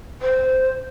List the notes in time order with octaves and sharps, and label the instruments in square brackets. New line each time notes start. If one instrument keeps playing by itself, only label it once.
[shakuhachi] C5